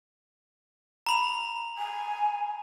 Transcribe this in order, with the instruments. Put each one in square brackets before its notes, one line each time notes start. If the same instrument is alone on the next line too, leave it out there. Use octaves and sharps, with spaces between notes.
[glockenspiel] A#5 B5 F7
[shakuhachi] G#5